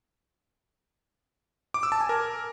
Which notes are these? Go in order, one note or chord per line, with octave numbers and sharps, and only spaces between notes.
D6
E6
A5
G#5
A#4